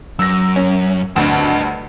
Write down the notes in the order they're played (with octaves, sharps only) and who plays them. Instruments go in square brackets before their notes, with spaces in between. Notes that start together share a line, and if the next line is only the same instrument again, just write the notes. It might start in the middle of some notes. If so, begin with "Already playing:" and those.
[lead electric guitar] F#2 [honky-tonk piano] E6 A#6
[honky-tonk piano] C#4
[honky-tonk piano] D2 G2 [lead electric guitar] D#5 A5